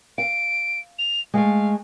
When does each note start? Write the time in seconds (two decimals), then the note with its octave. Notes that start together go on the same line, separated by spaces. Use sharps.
0.18 F5 D7
0.99 F7
1.34 G#3 A3 F5